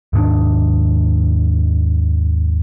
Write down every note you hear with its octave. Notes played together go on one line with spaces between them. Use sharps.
D#2 G#2 D#3 D4